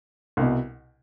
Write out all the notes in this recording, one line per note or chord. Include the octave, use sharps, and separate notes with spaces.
C2 B2